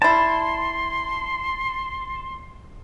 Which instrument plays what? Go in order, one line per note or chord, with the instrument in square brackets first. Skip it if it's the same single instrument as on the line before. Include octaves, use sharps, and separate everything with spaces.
[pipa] G3 E4 [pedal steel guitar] A5 [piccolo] C6